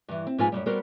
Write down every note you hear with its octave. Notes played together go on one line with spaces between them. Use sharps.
G2 E3
C4
G#2 F3 D#4 F4 B4 G#5
F#2 E3 G3
G3 B3 F#4 A#4 C5